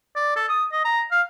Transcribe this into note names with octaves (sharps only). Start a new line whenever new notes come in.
D5
A4
D#6
D#5
A#5
F5